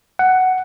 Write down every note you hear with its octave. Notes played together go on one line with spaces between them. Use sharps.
F#5